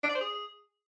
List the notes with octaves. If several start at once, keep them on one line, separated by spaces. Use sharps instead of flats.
D4
D5
C5
G#4